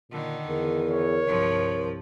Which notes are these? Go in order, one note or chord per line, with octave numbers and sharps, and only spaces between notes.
A#2 D3 D#3
E2 A#4
C#5
C2 G2 F3